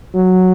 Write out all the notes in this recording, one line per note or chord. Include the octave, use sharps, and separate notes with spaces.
F#3